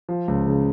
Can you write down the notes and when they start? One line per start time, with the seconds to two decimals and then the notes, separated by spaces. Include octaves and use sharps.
0.09 F3
0.28 C#2
0.47 C#3